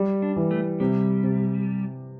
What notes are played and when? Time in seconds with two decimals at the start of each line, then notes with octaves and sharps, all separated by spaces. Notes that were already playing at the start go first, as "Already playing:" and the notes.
Already playing: G3
0.22 D4
0.36 E3
0.51 A3
0.80 C3 G3
1.23 C3